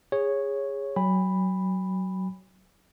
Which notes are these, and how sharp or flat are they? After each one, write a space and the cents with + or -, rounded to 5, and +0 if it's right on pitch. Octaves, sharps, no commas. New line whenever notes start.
G#4 -20 C#5 -5
F#3 +20 G#5 -45 B5 +0